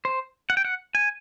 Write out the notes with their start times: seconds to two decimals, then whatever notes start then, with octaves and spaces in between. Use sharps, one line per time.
0.05 C5
0.50 F#5
0.57 G5
0.65 F#5
0.95 G#5